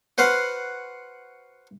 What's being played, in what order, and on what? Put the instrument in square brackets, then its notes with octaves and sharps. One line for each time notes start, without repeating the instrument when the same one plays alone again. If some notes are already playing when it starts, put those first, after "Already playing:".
[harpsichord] F#4 B4 C5 F5 F#5